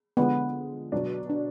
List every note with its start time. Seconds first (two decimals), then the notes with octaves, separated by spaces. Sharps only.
0.17 D3 F3 G#3 B3
0.92 B2 F#3 D4
1.30 D4